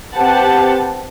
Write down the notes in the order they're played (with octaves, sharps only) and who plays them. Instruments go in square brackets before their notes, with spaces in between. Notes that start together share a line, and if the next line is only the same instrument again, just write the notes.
[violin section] C4 G4 B4 F#5 A5